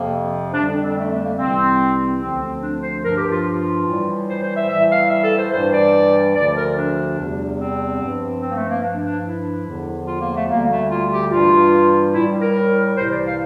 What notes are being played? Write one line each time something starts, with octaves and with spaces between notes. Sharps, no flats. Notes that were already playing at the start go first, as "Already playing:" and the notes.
Already playing: F2 C3 F3 A#3
F2 D3 G3 D4
D4
C4
A3
A3
A#3
C2 C3 E3 G3 C4
D2 D3 F3 C4
C4
D4
C5
G2 F3 A#4
G4
F4
F4
A2 E3 G3
C5
C5
E5
A2 E3 G3 E5
F5
E5
A4
C5
G2 E3 G3 C5
D5
D2 D3 F3 D5
A#4
D4
E2 C3 G3
C4
G2 F3
C4
A#3
A3
A#3
G2 F3 D4
D4
E4
E2 D3 F3
F4
A#3
A3
D2 D3 G3 A#3
A3
F4
G4
G2 E3 G3 F4
A2 G3 E4
A#4
C2 C3 E3 G3 C5
D5
F5